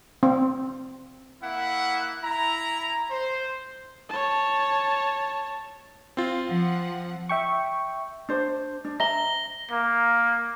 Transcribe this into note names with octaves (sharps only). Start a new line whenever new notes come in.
C4
A#3 E4 E5 F#5
E4 A#5
C5
C#5 A5
C4 F4
F3 F#5
E5 G5 C#6
D4 C5
D4
E5 A#5 A#6 G7
A#3